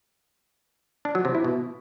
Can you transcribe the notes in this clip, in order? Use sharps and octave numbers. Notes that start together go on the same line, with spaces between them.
D4
F#3
C3
E4
B2